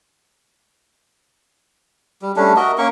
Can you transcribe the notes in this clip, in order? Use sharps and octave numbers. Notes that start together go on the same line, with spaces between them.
G3
G3 A3 C#4 D4
F#4 A#4 D#5 E5
A#3 C#4 A#4 C#6